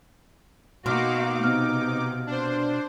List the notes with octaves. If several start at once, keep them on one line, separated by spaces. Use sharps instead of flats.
B2 A#3 D#4 F#4 F5 C6 D6 F6
C3 B3 F6
D4 C5